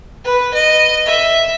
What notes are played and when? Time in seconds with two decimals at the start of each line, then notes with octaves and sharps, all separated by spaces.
0.24 B4
0.53 D#5
1.05 E5